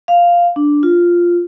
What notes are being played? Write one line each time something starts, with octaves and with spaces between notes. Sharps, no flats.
F5
D4
F4